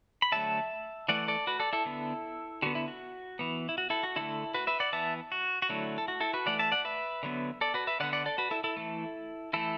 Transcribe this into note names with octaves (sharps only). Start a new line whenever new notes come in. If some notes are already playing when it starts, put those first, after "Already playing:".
B5
D3 F#3 A3 E5 A5
E3 A3 D5 F#5
A4 D5
F#4 B4
A4 D5
E4 A4
D3 B3
D3 B3 F#4
E4
F#4
E3 B3
E4
F#4
E4 A4
F#4
D3 A3 E4 A4
F#4 B4
B4 E5
D5 F#5
E3 B3 E5 A5
F#4
F#4
D3 F#3 A3 E4
A4
F#4
E4 A4
F#4 B4
E3 A3 D5 F#5
E5 A5
D5 F#5
B4 E5
D3 F#3 B3
A4 D5
F#4 B4
B4 E5
D3 B3 D5 F#5
D5 F#5
A4 D5
F#4 B4
E4 A4
E4 A4
E3 A3
E3 A3 E4 A4